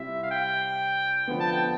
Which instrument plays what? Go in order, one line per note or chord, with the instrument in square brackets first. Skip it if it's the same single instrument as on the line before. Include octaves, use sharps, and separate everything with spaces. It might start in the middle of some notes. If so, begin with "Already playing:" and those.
Already playing: [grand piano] C3 G3 C4 E4 [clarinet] E5
[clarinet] F5
G5
[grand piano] D3 F3 B3
[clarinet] A5
G5